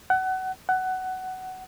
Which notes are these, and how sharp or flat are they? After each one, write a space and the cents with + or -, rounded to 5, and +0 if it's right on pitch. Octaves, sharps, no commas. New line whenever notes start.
F#5 +25
F#5 +15